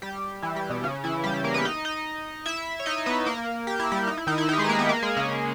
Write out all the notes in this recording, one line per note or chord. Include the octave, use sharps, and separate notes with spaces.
G3 G4
E3 E4
G3 G4
B2 B3
C#3 C#4
E3 E4
G3 G4
G3 G4
A#3 A#4
B3 B4
D#4 D#5
D#4 D#5
E4 E5
C#5
D#4 D#5
B3 B4
A#3 A#4
G4
E4
G3 G4
D#4
E4
D#3 D#4
E4
D#3 D#4
G4
G#3 G#4
B4
A#3 A#4
B3 B4
A#3 A#4
G#3 G#4
C#3 C#4